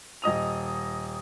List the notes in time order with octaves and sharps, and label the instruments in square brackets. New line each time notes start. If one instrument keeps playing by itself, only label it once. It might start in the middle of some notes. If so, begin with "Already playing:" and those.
[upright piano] D#1 D#5 D#6 F7